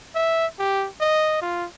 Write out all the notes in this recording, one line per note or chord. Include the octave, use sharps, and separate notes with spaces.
E5
G4
D#5
F4